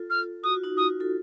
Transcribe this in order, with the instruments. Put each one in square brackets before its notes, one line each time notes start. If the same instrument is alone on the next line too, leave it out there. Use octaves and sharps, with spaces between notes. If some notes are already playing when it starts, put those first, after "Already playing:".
Already playing: [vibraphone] F4 A4
[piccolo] F6
[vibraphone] F#4 [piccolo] D#6
[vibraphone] F4
D#4 F#4
[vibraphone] F4 [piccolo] D#6
[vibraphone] F4 A4